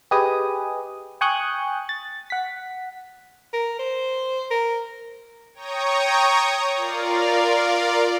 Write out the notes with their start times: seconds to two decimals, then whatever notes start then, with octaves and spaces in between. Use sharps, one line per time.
0.11 G4 G#4 B4 D#5 G#5 D#6
1.21 G5 G#5 C#6 D#6 F#6 G6
1.89 A6
2.30 F#5 B6
3.53 A#4
3.79 C5
4.51 A#4
5.54 C#5 G5 A#5 C#6 D#6
6.76 F4 A#4 D5 F5